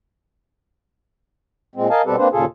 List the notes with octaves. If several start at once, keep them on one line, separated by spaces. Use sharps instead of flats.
A#2 G#3 C4
A#4 D#5 F5 G#5 A5
B2 G3 C4 G4 A4 B4
A#3 C4 D4 B4 C5
D#2 A#2 C#3 F4 G#4 A4